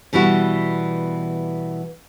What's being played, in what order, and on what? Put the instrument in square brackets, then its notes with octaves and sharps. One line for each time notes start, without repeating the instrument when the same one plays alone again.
[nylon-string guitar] B2 E3 G3 E4 F#4